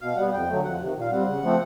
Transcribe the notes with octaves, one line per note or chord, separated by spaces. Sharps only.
B2 F5
G3 B3 F#5
F2 G5
D3 F#3 A3
F2 F#5
C3 D#3
A#2
F5
G3 C4 F#5
C#3
F3 A3 C4